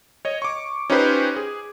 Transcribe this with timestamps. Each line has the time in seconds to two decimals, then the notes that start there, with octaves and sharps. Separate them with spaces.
0.25 C#5 D#5
0.42 C#6 D6
0.90 C#4 D#4 F4 G4 B4 C5
1.36 G#4